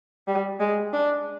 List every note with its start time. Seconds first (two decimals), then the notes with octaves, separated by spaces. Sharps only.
0.28 G3
0.60 G#3
0.93 D4